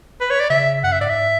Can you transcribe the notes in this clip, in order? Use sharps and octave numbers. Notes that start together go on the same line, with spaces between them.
B4
C#5
D5
C#3 E5
F#2 F#5
E5
G#2 D5
E5